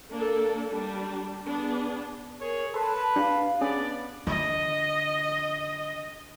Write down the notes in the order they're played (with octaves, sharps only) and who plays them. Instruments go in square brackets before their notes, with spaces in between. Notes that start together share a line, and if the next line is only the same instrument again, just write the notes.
[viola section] A#3 D4 A4
G3 D4
B3 D4 G#4
[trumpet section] G#4 C#5 [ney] A#4
[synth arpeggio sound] A4 C6 [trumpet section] B4 [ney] A5
[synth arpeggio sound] D4 G4 [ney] F5
[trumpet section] B3 D5 [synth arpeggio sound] C#4 G#4 [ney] D4
[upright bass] D3 [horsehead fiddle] D#5